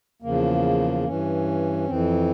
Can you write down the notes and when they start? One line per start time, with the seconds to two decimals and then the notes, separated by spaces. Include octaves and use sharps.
0.22 E2 C#3 F3 A#3
1.05 G2 E3 C#4
1.86 F2 E3 C4